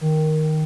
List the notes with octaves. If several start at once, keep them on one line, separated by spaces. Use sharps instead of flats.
D#3